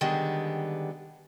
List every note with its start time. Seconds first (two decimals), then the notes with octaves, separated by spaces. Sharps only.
0.01 D3 D#3 G3 G#3 B3